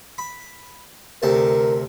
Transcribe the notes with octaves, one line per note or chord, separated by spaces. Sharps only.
B5
D2 C3 A#4 A5